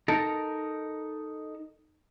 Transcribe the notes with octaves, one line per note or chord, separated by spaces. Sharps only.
D#4 A4 A#4